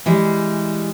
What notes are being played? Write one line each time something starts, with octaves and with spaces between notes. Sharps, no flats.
E3 G3 G#3